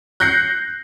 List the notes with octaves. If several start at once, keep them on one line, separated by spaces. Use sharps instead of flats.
F#6 G6 A#6 C7 C#7